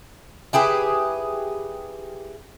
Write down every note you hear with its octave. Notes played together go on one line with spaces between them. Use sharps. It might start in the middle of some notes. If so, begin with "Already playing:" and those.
E4 G4 G#4 B4